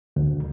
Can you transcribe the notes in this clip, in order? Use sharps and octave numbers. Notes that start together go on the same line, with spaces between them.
D2